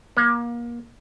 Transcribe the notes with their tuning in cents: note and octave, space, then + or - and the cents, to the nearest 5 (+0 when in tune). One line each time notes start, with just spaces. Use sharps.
A#3 +30